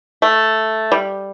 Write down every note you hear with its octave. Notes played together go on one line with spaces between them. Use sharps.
A3
G3